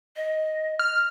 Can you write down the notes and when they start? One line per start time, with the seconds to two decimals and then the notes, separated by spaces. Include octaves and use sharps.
0.16 D#5
0.79 F6